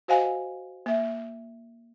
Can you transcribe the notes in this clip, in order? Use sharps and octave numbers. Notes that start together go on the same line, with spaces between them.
F#4 C5 D#5 F5 F#5 G#5
A#3 E5